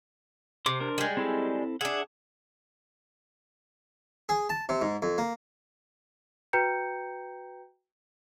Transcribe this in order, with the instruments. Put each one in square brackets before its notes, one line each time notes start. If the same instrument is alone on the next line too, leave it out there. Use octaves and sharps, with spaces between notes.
[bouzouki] C3 [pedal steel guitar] C5 D6
[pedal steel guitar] D4 A#4 C5
[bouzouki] G3 G#3
[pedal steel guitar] C4 E4 A4
[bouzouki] D4 G#4 [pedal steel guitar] E5 F#5
[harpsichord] G#4
A5
C3
G#2
F2
A#3
[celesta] F#4 B4 G5 A#5 G6 C#7